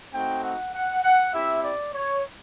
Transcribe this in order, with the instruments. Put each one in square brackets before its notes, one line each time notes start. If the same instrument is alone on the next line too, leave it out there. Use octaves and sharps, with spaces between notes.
[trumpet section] A3 C4 D#4 F#4 G5
F#5
F#5
F#5
C4 E4 G4 E5
D5
C#5